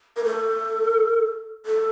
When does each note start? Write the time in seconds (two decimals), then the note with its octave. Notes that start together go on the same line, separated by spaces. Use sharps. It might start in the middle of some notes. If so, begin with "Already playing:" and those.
0.16 A#4
0.24 A4
1.66 A4